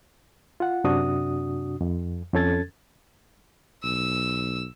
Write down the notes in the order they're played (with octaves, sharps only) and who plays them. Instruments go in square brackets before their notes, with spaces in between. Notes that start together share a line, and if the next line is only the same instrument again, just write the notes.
[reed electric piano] F4 F#5
F#2 C3 D4 F#4 D#6
F2
F2 C#4 A4 G#6 A6
[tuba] B1 [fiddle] E6